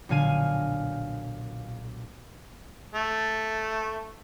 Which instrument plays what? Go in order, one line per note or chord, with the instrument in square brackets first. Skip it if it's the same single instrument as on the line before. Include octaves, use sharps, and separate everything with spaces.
[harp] B1 A#2 D3 F5 G#5 D#7
[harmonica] A3